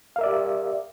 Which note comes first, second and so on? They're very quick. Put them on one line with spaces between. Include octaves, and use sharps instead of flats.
F5 A#4 E5 D5 G4